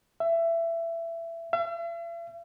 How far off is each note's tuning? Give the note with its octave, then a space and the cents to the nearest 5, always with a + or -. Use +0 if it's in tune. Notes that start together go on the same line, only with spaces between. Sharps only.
E5 +20
E5 +45